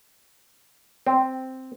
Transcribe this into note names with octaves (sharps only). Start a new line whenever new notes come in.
C4